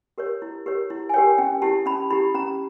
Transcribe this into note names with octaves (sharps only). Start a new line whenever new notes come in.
G4 A#4 C#5
E4
G4 A#4 C#5
E4
G#5
G4 A#4 C#5 G5
C#4 G5
E4 G4 A5
C#4 B5
E4 G4 B5
C#4 A#5